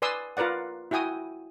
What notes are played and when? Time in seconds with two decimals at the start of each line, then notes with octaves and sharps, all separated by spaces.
0.02 B4 D5 G#5 C6 D#6 E6
0.37 F4 A#4 B4 D5 F#5
0.91 E4 F#4 G5 G#5 D#6